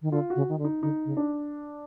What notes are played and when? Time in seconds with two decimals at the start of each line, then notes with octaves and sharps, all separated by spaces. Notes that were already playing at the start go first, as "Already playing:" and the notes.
0.02 D#3
0.11 D3 F4
0.30 F#4
0.36 C#3
0.49 D#3
0.59 D3
0.65 D#4
0.82 D3 D#4
1.05 C#3
1.17 D4